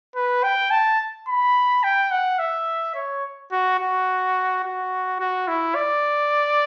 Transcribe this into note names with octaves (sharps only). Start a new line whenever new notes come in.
B4
G5
A5
B5
G5
F#5
E5
C#5
F#4
F#4
F#4
F#4
E4
D5